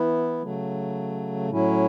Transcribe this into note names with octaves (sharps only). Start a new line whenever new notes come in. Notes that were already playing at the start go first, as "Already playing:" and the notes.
Already playing: E3 B3 E4
C#3 F#3 A3
A2 F#3 C#4 E4